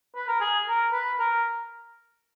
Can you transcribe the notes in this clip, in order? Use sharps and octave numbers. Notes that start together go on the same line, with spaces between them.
B4
A#4
G#4
A#4
B4
A#4